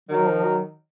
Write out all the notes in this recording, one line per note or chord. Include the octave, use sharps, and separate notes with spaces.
D#3 F#3
F3
F#3